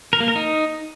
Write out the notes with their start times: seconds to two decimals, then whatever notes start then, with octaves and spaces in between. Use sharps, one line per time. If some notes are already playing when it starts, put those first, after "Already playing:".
0.13 A#4
0.20 A#3
0.28 A#4
0.35 D#4